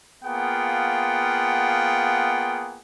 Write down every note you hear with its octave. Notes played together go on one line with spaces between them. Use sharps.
A#3 B3 F4 G#4 F#5 G5